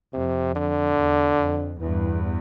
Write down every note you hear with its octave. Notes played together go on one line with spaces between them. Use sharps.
F2 C3
D3
E2
F2
E2 G2 E3